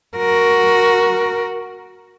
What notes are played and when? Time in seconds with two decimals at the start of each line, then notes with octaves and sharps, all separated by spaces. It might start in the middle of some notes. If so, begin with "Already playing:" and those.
0.17 F#4 A#4